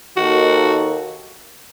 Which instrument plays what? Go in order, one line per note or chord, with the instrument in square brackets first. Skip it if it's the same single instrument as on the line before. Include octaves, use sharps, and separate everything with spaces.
[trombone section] D#2 D#3 A#3 D#4 A4 [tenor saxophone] F#4